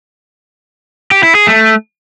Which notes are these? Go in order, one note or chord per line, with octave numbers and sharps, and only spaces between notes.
G4
E4
G#4
A3